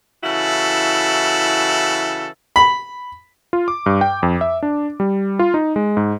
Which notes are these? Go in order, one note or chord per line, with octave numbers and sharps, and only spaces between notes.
C#3 E3 E4 F#4 A4
B5
F4
D6
G2
G5
F2
E5
D4
G3
F4
D#4
G#3
G#2